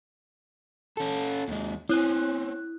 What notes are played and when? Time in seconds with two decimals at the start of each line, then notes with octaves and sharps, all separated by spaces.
0.97 C#4 A4
1.48 D#2 G#3
1.89 C4 C#4 E4 F#6